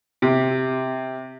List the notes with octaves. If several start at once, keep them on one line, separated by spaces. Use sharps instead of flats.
C3